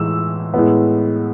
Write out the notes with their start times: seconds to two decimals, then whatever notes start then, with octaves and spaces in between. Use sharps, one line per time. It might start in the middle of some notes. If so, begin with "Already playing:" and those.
Already playing: A2 E3 G#3 E6
0.54 A2 G#3 B3